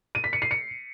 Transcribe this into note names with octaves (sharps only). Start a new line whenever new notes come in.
D#7
B6
C#7
C7
C#7